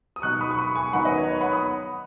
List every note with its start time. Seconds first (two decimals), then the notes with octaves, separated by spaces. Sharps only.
0.16 D#6
0.22 B2 F#3 D#4 C#6 F#6
0.41 B5 D#6
0.51 C#6
0.58 B5 D#6
0.75 G#5 C#6
0.93 D#3 F#3 B3 D#4 F#5 B5
1.05 B4 D#5
1.18 C#5
1.29 C#5
1.41 F#5 B5
1.52 B5 D#6